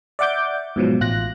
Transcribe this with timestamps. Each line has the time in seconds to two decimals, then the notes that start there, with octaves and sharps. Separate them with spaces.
0.19 D5 E5 F#5 D6 G6
0.76 G#2 B2 F3 F#3
1.01 A1 F4 F#6 A#6